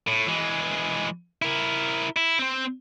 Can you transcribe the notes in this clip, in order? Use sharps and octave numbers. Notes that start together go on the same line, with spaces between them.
A2
E3 G#3
E4 A#4
E4
C4 C5